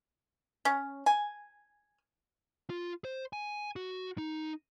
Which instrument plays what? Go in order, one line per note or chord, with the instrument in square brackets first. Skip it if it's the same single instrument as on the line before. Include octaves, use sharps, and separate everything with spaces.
[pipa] C#4
G#5
[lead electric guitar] F4
C5
G#5
F#4
D#4